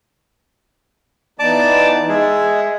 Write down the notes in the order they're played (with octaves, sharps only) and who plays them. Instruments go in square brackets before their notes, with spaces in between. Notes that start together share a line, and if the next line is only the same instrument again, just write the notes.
[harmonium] E3 B3 D#4 [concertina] D5 A5 D6
[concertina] G#3 G#4 [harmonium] E5